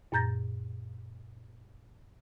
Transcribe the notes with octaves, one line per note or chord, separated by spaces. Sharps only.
F#2 A#2 A#5 G6 A6 A#6